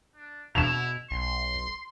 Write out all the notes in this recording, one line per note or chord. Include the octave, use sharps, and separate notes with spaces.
D4
B2 E4 E7 F7
B1 C6